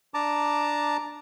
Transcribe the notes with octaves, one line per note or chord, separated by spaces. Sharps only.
D4 A5 A#5 D6